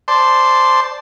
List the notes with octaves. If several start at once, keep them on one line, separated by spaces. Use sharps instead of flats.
C5 D5 A5 C6